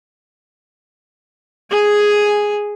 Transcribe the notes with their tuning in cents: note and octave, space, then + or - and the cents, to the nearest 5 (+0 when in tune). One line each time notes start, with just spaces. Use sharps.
G#4 +0 G#5 +0